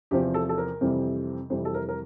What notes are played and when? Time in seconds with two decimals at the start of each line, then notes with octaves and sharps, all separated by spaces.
0.11 E2 C3 F3 C4 G4
0.34 A4
0.49 A4
0.58 A#4
0.81 F2 C3 E3 G3 C4
1.50 F2 C3 E3 G3 C4 C5
1.65 A4
1.74 A#4
1.89 A#4